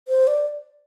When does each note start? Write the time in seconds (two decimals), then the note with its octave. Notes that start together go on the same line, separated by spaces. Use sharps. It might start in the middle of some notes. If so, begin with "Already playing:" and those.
0.08 C5
0.27 D5